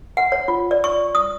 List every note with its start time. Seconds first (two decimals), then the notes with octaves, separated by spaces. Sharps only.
0.17 F#5
0.32 C#5
0.48 F4
0.71 D5
0.84 C#6
1.15 D#6